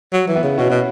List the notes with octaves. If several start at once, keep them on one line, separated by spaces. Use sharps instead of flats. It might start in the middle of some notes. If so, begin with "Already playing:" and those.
F#3
E3
B3 E4
C#3
B2 C#4 F#4
B2